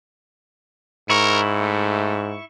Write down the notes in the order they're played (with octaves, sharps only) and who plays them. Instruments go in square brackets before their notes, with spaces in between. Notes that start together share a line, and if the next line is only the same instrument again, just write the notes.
[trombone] G#2 [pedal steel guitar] E4 C#6 [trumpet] A#4
[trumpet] A3